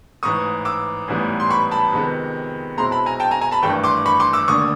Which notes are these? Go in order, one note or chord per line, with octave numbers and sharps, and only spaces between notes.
A1 G#2 E3 C#6 D#6
D6 E6
A1 G#2 E3 G3 B3
C6
B5 C#6
A5 B5
F2 C3 D#3 G#3 B3
B1 B2 G#3 C4 E4 A#5 C6
A5 B5
G#5 A#5
G5 A5
G#5 A#5
G#5 A#5
A5 B5
G#1 G2 E3 A3 G5 A5
C6 D6
B5 C#6
C6 D6
D6 E6
F1 D#2 D3 C#6 D#6